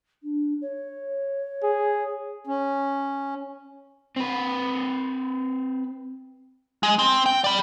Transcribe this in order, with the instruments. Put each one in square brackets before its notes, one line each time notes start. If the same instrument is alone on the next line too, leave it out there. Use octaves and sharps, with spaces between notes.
[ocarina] D4
C#5
[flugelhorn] G#4
[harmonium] C#4
[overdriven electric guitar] C4 B4
[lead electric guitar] G#3
C4
G5
D5 B5